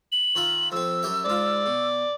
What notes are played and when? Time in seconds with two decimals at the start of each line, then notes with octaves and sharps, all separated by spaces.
0.12 F#7
0.35 D#3 F4 E5
0.72 F2 C4 E6
1.03 F#2 G4 E5
1.25 G#2 F4 D5
1.66 B2